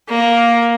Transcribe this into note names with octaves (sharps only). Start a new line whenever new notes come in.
A#3